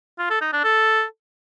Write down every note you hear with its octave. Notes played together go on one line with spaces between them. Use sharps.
F4
A4
D#4
D4
A4